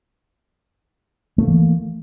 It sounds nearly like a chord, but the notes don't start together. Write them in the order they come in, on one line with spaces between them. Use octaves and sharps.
A3 A#3 E3